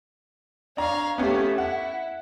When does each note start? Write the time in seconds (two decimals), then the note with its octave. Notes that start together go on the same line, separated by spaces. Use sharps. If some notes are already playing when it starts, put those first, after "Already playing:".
0.77 D4 C#5 F5 A#5
1.18 A3 B3 C#4 G4
1.58 E4 F#5